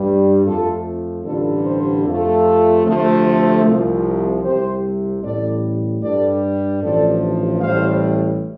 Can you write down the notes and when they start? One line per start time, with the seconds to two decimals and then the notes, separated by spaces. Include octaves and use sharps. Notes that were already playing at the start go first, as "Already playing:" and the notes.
Already playing: G2 G3
0.45 F2 F3 A3 F4 A4
1.25 A1 G2 D3 G3 F4 A4
1.64 G4 C5
2.04 F2 C3 A3 F4 A4
2.85 D2 C3 F3 A3
3.64 C2 C3 F3
4.43 C2 C3 G3 G4 C5
5.22 A1 A2 G3 A4 D5
6.02 G2 G3 A4 D5
6.81 A1 G2 F3 A3 A4 D5
7.61 A1 A2 G3 C5 F5